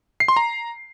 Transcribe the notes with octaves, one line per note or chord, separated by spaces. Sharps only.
C7
C6
A#5